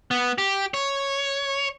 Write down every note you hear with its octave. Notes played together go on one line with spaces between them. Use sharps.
B3
G4
C#5